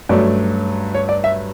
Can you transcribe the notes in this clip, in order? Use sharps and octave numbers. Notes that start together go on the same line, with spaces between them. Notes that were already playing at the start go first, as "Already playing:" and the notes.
G2 F#3 A3 C#4 D5
C#5
D5
E5